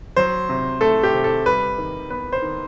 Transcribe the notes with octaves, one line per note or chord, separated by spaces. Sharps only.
F#3 C5
C3
A3 A4
G4
C3
A4
G3 B4
D#3
B3 B4
C5
D#3